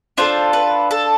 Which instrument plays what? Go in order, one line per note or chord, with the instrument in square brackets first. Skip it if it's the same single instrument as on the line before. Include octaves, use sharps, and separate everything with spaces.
[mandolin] D4 F4 A4 C5
B4
A4